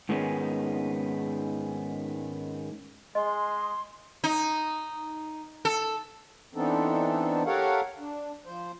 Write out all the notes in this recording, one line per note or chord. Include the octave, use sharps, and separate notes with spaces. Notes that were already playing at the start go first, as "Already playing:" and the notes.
G#2 D#3 G#3 B3 C#4
G#3 D#5 C6
D#4
A4
E3 B3 C4 D4 D#4 A4
G4 A4 A#4 C#5 F5 F#5
D4
F3 C5